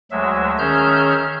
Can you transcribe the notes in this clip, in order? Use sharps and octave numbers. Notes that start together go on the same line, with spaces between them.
D2 F#3 G#3 E5
D#3 C#4 G#4 E5 F6 G6